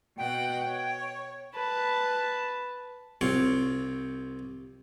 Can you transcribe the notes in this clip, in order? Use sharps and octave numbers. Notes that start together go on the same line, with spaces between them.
B2 F#5 G5
C#5
B4 A5
C2 C4 F4 C#5